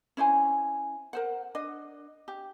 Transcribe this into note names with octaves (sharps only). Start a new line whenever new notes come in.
C#4 E4 C5 G#5
A#4 C5 F#5
D4 D#5
G4